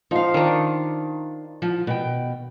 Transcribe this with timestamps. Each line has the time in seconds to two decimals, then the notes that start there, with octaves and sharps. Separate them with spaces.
0.11 F3 D#4 F5
0.34 D#3 D4
1.62 F3
1.87 B2 G5